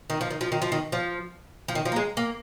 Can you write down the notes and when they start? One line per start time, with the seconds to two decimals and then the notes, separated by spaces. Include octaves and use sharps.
0.10 D#3
0.21 F3
0.30 D#3
0.41 F3
0.52 D#3
0.62 F3
0.72 D#3
0.92 F3
1.68 F3
1.75 D#3
1.85 F3
1.92 A#3
1.96 G#3
2.17 A#3